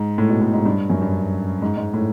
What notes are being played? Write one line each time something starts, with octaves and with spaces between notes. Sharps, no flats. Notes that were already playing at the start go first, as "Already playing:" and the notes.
Already playing: G#2
A2
B2
A2
G#2
G2
F#2
G2
G#2
G#2
A2